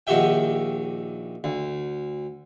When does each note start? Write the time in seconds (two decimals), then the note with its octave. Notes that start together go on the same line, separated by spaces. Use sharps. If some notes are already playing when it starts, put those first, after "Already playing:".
0.07 A#1 D#3 F#4 G4 E5 G5
1.44 D2